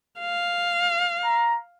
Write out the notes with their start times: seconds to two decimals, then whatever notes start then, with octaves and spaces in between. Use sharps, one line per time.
0.20 F5
1.24 A#5